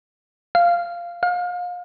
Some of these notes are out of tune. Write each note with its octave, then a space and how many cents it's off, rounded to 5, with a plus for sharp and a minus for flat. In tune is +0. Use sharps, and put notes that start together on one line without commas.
F5 -10
F5 +35